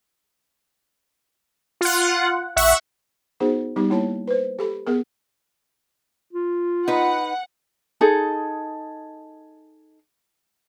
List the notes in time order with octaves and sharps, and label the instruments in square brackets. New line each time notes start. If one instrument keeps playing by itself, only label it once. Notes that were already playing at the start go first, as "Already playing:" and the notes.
[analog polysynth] F4 F#5
[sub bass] A#1 [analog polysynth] E5 F#5 C#6
[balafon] B3 D#4 F#4 G#4 C5
G3 B3 D#4 G4
A#3 E4 C#5 A5
B4 C5
G4 A4 B5
B3 G#4 A#4
[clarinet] F4
[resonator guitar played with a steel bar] D#4 B4 [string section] F#5
[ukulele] D#4 G#4 A4